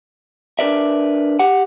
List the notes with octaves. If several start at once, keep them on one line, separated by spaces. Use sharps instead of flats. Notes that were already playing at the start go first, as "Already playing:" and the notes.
D4 A#4 B4 D5 E5
G4 F#5